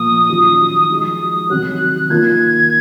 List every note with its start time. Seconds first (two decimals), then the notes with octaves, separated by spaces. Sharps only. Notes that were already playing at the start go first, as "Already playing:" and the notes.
Already playing: A#2 F3 A#3 D#6
0.29 D#3 F#3 C#4 F4
0.89 F3 G#3 D#4 F#4 D#6
1.50 C3 D#3 F#3 F#6
2.10 D#3 A#3 F4 G#6